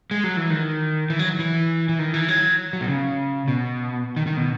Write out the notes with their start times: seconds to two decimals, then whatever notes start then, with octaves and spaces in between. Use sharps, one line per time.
0.11 G#3
0.24 F#3
0.37 E3
0.50 D#3
1.10 E3
1.19 F#3
1.39 E3
1.89 E3
1.99 D#3
2.14 E3
2.28 F#3
2.73 F#3
2.81 B2
2.88 C#3
3.48 B2
4.16 D#3
4.27 D#3
4.37 B2